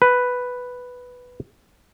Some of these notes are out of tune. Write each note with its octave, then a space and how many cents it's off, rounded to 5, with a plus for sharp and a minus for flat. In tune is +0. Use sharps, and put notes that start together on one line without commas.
B4 +5